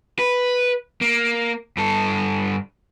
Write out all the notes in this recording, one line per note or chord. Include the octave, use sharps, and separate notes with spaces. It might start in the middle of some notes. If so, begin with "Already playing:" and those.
B4
A#3
G2 A4